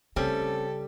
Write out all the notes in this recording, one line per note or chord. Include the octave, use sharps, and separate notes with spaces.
C#3 G3 A3 C4 C#4 A4